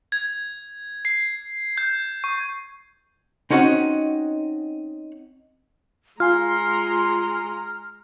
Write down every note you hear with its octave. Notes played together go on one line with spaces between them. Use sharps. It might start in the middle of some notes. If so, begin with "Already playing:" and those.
G#6
C7
G6
C#6
C4 C#4 D#4 F#4 F#5
G#3 F4 G#5 A#5 C6 F6